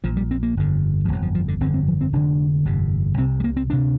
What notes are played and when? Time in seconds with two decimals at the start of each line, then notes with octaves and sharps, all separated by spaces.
0.04 A#1 A#2 F3
0.17 G3
0.31 C4
0.43 A#3
0.57 G1 F2 D3
1.05 F3
1.08 G1 F2 C3 G3
1.22 F3
1.35 F3
1.48 D3
1.60 G1 F2 D3 C4
1.74 C4
1.87 F3
2.01 C4
2.13 F1 F2 D3 D4
2.65 G1 F2 C3
3.17 C2 C3 C4
3.40 G3
3.44 A#3
3.57 C4
3.70 D2 C3 D4